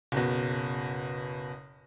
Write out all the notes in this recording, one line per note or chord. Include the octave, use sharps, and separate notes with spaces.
F#1 B2